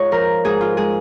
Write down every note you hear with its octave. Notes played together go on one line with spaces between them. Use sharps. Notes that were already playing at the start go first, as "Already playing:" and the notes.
Already playing: G#2 F4 G#4 C#5 D#5
F3 A#4
G#2 G#4
F4
G#3 G#4